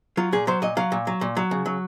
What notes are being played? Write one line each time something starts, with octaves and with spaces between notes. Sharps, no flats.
F#3 F4
A#2 G#4
F#3 C5
A#2 D#5
F#3 F5
A#2
F#3
A#2
F#3
C#3
F#3